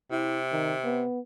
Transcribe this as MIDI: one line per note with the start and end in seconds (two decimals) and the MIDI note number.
0.11 1.03 48
0.11 0.40 64
0.52 0.74 51
0.84 1.20 59